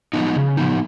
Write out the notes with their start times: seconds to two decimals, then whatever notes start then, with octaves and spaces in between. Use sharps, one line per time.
0.13 F3 B3 D#4
0.36 C#3
0.57 F3 B3 D#4